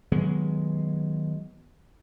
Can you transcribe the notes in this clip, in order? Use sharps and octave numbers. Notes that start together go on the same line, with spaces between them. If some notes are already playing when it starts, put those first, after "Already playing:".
D#3 F#3 G#3 B3